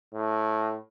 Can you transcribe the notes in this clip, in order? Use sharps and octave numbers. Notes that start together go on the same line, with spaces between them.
A2